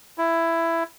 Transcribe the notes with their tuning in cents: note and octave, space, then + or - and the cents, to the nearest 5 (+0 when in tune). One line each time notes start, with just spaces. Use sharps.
E4 +10